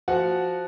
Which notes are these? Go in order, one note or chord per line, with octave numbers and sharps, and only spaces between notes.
F3 F#4 F#5